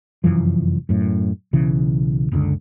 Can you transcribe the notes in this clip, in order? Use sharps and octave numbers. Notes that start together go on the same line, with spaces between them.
F1 F#2 E3 F3
F#2 A2
B1 C#3 E3
F#1 C#2 D3